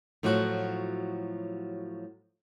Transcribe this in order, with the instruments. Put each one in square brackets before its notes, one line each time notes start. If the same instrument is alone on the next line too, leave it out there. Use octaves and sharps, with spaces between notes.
[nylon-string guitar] A2 F3 F#3 F4 F#4